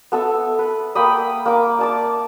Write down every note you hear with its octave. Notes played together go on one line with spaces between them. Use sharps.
B3 A4 E5
B4
A#3 G5 B5 D#6
A#3 D6
D5 A5 D6